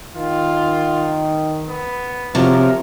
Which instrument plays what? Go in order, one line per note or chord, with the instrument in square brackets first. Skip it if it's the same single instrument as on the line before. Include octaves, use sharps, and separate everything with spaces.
[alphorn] D#3 [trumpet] F4
[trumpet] B3
[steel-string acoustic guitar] C3 F#3 [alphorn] F3 [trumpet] A#4